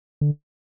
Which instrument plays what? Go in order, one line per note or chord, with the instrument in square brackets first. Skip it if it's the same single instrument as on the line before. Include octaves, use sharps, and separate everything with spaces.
[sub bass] D3